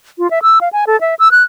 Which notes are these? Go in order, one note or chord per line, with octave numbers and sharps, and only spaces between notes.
F4
E5
E6
F5
G#5
A4
E5
E6
F#6